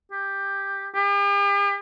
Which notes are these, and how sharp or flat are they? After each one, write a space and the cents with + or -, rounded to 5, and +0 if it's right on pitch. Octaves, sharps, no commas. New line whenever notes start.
G4 +10
G4 +45